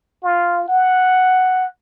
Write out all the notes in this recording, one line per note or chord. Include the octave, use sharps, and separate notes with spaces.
F4
F#5